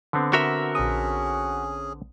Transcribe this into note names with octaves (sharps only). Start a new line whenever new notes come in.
D3 B3 C4
F#4 A#4 E5
A#1 C#4 G#4 D#6